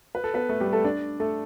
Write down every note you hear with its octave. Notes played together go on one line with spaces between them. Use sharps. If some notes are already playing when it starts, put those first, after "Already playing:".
B4
A4
B3 B4
A3 A4
G3 G4
A3 A4
D4 D5
A3 A4